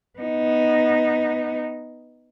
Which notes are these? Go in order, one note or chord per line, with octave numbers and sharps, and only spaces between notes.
B3 D#4